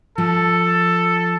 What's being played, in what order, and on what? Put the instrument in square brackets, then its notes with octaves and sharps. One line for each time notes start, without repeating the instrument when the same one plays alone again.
[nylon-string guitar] F3 [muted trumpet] A4